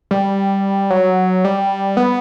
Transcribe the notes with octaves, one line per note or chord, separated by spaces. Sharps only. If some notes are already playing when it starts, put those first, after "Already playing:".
G3
F#3
G3
B3